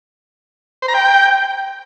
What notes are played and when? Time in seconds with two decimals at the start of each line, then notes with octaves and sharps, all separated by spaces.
0.82 C5
0.88 A#5
0.94 G5